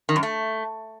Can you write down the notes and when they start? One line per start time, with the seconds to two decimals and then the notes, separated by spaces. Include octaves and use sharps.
0.09 D#3
0.16 F#2
0.23 A3